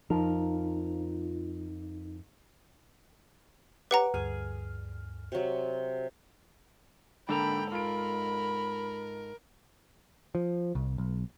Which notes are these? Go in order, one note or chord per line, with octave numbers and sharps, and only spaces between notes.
F2 F3 D#4 A#4
G4 B4 C#5 F#5 A#5 D6
D2 G2 G#4 F6
C3 F#3 F#4
G#2 D3 A#3 A4 G5 A#5 B5
F4 A#4 B5 D7
F3
C2
B1